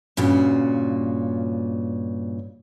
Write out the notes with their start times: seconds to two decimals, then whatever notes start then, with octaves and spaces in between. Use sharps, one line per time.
0.17 G2 A#2 C#3 F4 F#4